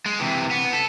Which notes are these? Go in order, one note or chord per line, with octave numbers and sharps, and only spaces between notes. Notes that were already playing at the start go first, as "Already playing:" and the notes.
G#3
C3 E3
B3
A4